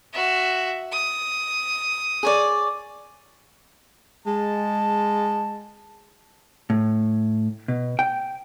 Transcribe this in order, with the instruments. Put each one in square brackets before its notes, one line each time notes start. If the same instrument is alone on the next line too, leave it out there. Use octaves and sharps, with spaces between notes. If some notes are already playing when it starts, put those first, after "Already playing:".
[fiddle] F#4 E5
D#6
[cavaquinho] G#4 C#5 D5
[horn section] G#3 A5
[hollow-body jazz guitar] A2
B2
G5